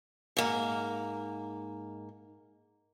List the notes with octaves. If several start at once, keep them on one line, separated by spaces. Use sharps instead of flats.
G#2 A#3